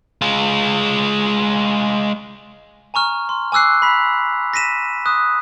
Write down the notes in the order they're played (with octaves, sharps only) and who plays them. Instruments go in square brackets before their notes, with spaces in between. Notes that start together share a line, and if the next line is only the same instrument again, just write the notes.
[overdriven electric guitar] G#3 F4
[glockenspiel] G#5 A#5 C#6 F6
C6
G#5 D6 E6 F#6 C7
B5 B6 F7
A#6 B6 D#7 E7
C#6 D#6 F#6